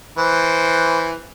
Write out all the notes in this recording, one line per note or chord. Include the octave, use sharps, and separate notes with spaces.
E3 C5